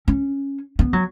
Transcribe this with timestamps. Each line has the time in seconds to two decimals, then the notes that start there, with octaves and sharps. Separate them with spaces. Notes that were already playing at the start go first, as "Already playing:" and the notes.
0.08 C#4
0.79 B3
0.93 F#3